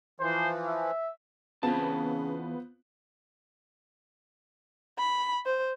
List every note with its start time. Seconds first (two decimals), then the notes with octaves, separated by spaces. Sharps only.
0.20 E3 F3 C5
0.65 E5
1.63 E2 C#3 B3 C4 F4 A5
4.99 B5
5.46 C5